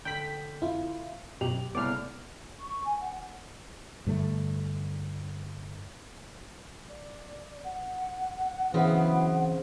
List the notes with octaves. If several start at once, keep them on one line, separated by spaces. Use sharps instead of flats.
D3 G5 G6 B6 F#7
F2 E4 F4
F#2 B2 G4 F7 F#7
C2 A2 C#3 B3 D5 F6
C#6
G#5
F#5
G2 D3 A3
D5
F#5
C#3 E3 F#3 B3 C4 E4